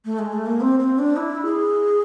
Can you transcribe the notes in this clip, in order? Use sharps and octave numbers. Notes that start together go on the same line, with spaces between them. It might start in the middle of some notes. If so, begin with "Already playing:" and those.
A3
G#3
A3
A#3
C4
C4
D4
E4
G#4